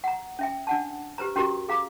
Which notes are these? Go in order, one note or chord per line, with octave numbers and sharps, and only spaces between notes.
F#5 A#5
C#4 E5 G5
D4 F#5 A5
G4 B4 C5 A#5
C#4 F#4 G4 A#4 A#5 C#6
G#4 F5 A#5 D6